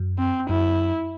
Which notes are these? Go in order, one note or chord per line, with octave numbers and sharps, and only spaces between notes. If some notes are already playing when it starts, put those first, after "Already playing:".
Already playing: F#2
C4
F#2 E4